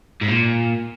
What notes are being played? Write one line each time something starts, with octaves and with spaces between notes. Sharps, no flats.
G#2
A#2